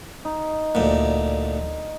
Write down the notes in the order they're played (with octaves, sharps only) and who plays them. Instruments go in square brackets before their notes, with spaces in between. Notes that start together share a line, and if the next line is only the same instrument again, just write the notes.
[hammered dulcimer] D#4
[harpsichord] D2 A#2